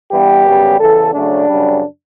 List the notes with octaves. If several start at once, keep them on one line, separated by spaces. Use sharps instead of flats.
G2 E3 G3 B3 G4
F#2 C#3 G3 B3
E2 C#3 E3 A4
C#3 F#3 A3 D4
F#2 C#3 G3